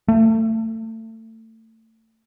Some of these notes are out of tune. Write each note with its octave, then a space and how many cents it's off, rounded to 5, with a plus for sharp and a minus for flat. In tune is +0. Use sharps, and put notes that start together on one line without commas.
A3 +25